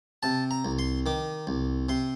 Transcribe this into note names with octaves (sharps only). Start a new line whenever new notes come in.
C3 A5
A#5
C2
C6
D#3 D6
C2
C3 C6